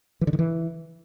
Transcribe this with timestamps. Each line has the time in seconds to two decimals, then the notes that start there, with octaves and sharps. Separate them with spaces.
0.21 E3
0.27 D3
0.33 D#3
0.39 E3